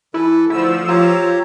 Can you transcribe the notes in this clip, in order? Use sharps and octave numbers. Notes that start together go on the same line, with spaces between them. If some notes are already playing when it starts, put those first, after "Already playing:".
E3 E4 A4 B4
D3 F3 A3 E4 E6
F4 G4 C#5 A#5